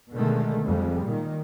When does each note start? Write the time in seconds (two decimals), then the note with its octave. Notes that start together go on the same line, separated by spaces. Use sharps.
0.12 B2 D3 D#3 G#3 A3
0.63 F2 G3 G#3
1.04 A#2 D#3